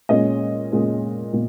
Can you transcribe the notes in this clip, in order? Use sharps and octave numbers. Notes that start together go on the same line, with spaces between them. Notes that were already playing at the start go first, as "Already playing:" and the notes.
A#2 G#3 C#4 D#5
A#2 G#3 C#4
A#2